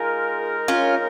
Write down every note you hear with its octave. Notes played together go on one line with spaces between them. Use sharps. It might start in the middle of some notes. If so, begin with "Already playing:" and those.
Already playing: G#3 D#4 F4 G#4 A#4
C#4 F4